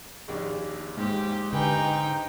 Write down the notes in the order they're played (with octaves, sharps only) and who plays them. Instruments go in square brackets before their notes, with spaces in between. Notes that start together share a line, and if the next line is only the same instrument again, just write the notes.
[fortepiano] A#1 D#2
[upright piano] G#2 [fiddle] G4
[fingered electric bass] D3 [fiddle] D#4 G5 [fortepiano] G4 B4 G#5